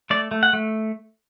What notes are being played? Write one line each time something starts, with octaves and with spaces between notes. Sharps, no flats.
A3 D5
A3
F#5
A3